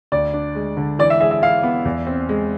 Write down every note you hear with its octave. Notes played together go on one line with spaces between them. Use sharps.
D2 D5
D4
G#3
D3
E3 D5
E5
G#4 E5
E5
E4 F5
B3
E2
C4
G#3